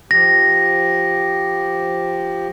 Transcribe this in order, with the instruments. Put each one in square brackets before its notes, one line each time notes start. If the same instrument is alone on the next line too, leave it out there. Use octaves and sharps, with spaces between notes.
[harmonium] F3 G4 [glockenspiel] A#6